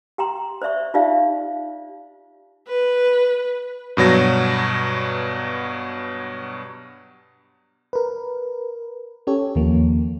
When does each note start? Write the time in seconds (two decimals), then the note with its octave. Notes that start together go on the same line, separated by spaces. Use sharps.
0.18 G4 G5 A#5 C6
0.62 C5 D5 E5 C#6
0.94 D#4 F4 G4 D5 E5 F5
2.68 B4
3.97 G2 B2 F#3 A#6
7.93 A#4 B4
9.27 C#4 G4 A4 C#5
9.55 D#2 F3 A#3